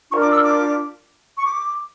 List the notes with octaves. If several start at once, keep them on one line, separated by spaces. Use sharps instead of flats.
D4 F4 A#4 C#6
D6
E6
D6
C#6
D6